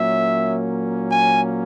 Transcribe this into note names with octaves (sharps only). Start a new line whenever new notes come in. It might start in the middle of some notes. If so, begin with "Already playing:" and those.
Already playing: A#2 F#3 A#3 C#4 E5
G#5